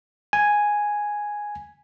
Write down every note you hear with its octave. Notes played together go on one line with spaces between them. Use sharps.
G#5